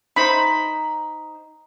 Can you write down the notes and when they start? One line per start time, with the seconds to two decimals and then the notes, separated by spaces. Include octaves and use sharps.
0.16 D#4 C5 A#5 B5